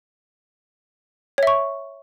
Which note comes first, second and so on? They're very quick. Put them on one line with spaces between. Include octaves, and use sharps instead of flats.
C#5 E5 C#6